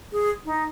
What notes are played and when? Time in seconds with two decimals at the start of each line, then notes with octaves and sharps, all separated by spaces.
0.12 G#4
0.45 D#4